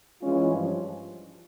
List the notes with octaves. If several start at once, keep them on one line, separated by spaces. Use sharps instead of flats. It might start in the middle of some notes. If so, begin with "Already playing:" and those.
E3 G#3 C#4 F4
G2 F3